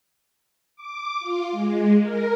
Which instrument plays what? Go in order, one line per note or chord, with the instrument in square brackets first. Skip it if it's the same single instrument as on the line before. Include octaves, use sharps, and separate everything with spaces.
[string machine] D6
F4
G#3
A#4